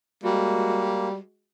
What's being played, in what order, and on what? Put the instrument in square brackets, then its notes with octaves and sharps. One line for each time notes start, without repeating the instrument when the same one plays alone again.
[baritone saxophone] G3 [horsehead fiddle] G#3 F#4 [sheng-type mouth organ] A#3